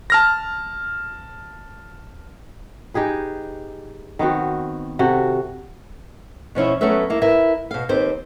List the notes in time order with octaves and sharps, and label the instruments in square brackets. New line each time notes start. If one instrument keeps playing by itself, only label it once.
[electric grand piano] A5 F6 A#6
[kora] D#4 G4 G#4 B4
D#3 B3 C4 F#4
C3 F#4 A4
[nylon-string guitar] B2 F3 C#4 E4
F#3 A3 B3 C#4 B4 E5
A#3 E4
E4 A#4 B4 E5
B2 F5
D#2 C4 G4 B4 C5